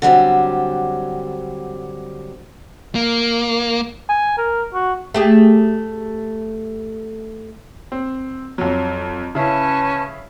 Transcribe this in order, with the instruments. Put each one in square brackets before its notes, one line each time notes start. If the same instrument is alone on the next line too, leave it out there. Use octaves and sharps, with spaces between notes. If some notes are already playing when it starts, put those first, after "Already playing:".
[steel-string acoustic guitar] D3 F#3 G3 C4
[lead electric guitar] A#3
[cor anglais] G#5
A#4
F#4
[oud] A3 G4 G#4
[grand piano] C4
F2 F#3
[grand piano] C#3 E4 [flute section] C#4 B4 A5